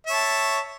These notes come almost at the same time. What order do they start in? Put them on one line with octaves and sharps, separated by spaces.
E5 C#5 A5